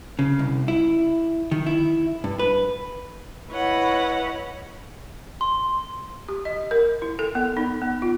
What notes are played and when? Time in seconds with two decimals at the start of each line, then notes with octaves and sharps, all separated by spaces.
0.19 C#3
0.39 C2
0.68 E4
1.51 D#3
1.66 E4
2.24 G2
2.39 B4
3.50 E4 B4 C#5 D#5 F#5
5.41 C6
6.29 G4
6.45 D#5
6.71 A#4
7.02 E4
7.19 A4
7.35 B3
7.57 D#4
7.81 B3
8.02 F4